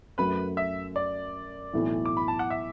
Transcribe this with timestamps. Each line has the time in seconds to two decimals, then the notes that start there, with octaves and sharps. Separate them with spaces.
0.18 F#2 F#3 A3 B4 B5
0.57 E5
0.96 D5
1.73 B1 A2 E3
2.06 D6
2.17 B5
2.28 A5
2.39 F#5
2.50 E5